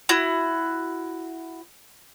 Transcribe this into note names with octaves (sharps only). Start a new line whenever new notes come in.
E4 F#4